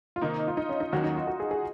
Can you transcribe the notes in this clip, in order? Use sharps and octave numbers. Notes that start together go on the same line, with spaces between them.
F4
C3 D#3 A#3 D#4
F4
D#4
C#4
D#4
D#2 D#3 F#3 C#4 F#4
D#4
F4
F#4
G#4
G#4